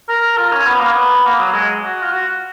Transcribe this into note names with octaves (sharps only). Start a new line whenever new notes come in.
A#4
F4
C#4
B3
A#3
B3
A#3
F#3
G#3
F#4
F4
F#4